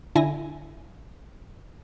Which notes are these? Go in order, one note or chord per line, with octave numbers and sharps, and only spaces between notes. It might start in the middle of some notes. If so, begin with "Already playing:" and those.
D3 E4 G#5 A#6